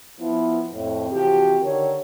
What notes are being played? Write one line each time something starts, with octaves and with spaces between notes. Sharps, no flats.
F3 B3 E4
F2 A2 C4
C3 E3 F3 C4 F#4 G4
D3 D#3 G4 A#4 C#5